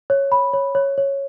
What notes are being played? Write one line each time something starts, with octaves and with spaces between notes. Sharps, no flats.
C#5
B5
C#5
C#5
C#5